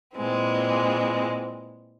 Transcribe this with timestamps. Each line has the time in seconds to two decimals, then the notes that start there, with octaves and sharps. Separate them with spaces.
0.15 A#2 E3 G#3 C4